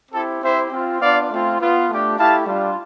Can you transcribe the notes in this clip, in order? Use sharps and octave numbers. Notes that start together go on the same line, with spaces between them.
C4 E4 G4 A4
C4 E4 G4 C5 E5
C4 F4
B3 D4 F4 D5 F5
A3 C4 F4
B3 F4
A3 D4 G4
A3 E4 G4 F5 A5
G3 D4 F4